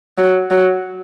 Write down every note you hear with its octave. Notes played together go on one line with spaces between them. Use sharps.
F#3
F#3